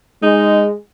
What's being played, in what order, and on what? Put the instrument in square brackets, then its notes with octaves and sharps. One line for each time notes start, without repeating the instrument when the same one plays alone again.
[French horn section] G#3 [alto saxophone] D#4